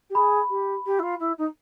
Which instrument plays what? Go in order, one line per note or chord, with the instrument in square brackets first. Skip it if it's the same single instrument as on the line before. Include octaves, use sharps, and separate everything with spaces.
[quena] G4
[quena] G#4 [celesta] B5
[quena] G4
G4
E4
F4
E4
D#4